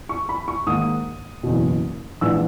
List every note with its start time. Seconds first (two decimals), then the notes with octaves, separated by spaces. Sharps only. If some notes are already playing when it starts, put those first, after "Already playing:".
0.09 C#6
0.29 B5
0.48 C#6
0.67 G#2 D#3 A#3 D#6
1.43 F#1 E2 B2
2.21 A#1 G#2 E3 E6